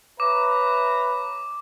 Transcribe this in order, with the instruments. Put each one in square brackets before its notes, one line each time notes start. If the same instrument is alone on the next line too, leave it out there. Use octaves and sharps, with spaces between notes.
[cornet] B4 [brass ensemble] C#5 E5 A#5 [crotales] D6